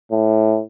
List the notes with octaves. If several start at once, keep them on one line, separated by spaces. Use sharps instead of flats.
A2